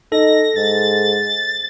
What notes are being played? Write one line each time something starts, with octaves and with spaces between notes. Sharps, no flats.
D#4 A4 A#6
G#2 A6